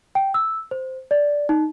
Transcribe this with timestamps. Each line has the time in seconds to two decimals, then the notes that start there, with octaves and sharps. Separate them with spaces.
0.15 G5
0.34 E6
0.71 C5
1.11 D5
1.49 D#4